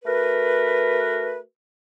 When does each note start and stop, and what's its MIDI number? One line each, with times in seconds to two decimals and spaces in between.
0.04 1.39 57
0.04 1.39 66
0.04 1.39 70
0.04 1.39 71